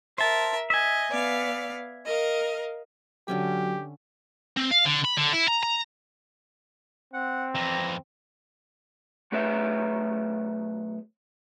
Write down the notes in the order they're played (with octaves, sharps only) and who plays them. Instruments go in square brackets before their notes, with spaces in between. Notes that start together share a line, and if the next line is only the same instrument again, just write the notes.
[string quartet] A#4 E5 [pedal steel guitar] C5 A5
[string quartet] D#5 [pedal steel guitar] E5 G#5
[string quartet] B3 D5 F5
A#4 D#5 F5
[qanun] D3 C#4 E5 [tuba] F#3 [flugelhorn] G4
[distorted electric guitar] C4
F5
D3
B5
D3
E4
A#5
A#5
[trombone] C4 [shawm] F#5
[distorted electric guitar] F2 E3 [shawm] A#5
[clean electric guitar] B1 A3 G#4 B4 C#5 E5